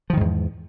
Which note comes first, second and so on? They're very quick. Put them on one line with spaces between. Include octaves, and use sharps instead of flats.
F3 D#3 G#2 E2